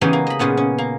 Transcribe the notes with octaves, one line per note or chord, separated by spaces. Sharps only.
C#3 E3 B3 D#4 G4 G#4
A#3
D#5 B5
A#2 C#3 B3 D#4
C#4
A#3